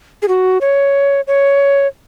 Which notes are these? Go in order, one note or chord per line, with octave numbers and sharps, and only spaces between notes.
G#4
F#4
C#5
C#5